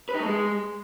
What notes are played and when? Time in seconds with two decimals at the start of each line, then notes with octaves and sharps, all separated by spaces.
0.09 B4
0.14 D#4
0.20 A3
0.26 G#3